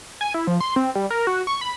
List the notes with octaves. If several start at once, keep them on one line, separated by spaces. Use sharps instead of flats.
G#5
E4
F3
C6
C4
G3
A#4
F#4
C#6
B5